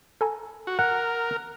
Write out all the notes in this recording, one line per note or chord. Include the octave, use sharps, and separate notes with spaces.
A4 G#5 A#5
F#4
A#4 F#5